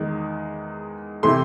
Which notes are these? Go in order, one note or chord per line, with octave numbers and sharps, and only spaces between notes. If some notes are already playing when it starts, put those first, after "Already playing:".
Already playing: E2 D#3 G#3
C3 E3 A3 C6